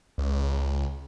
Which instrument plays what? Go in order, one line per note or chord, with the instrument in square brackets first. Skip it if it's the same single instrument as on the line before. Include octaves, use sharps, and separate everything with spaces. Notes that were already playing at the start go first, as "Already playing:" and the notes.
[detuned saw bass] C#2